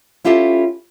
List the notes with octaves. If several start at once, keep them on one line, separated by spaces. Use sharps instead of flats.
C#4 E4 F4 G4 A4